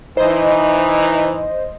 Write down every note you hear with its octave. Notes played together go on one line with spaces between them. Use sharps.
E3 D#4 C5 D#5